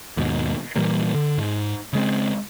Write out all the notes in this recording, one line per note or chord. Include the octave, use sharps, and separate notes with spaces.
D#2 G#2 B2
A#2 E3 G3 A#3
D3
G#2
C#3 G#3 C4